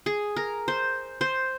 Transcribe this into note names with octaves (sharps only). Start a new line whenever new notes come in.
G#4
A#4
C5
C5